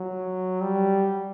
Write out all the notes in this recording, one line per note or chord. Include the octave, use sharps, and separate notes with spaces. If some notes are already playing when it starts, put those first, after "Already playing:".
Already playing: F#3
G3